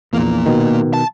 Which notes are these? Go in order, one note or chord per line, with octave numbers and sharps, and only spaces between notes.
A#1 E2 A#2 A#3
B2 D#3
A5